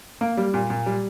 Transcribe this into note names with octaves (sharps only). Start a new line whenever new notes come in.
A#3
G3
A#2
A#2
G3